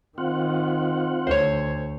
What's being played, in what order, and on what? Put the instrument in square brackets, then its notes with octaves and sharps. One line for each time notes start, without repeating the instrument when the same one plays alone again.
[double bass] D#3 [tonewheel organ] C4 F4 F#5
[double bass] D2 [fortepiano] C5 C#5